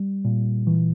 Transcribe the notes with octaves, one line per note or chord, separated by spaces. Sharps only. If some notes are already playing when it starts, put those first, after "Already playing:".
Already playing: G3
A#2
E3